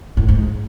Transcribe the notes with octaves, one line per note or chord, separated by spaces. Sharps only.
A2
G#2